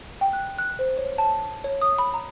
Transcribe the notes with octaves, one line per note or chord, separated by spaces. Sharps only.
G5
F#6
F#6
C5
C#5
A5
C#5
D#6
B5
A#5